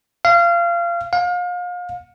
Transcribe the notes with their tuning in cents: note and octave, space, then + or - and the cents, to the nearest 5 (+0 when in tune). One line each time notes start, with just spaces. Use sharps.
F5 -25
F5 +35